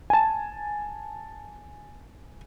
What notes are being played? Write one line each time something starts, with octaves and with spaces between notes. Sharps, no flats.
G#5 A5